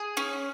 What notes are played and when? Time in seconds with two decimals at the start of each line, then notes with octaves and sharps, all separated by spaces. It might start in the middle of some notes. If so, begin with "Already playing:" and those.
Already playing: G#4
0.17 C#4